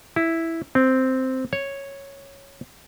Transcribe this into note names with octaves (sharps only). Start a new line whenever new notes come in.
E4
C4
C#5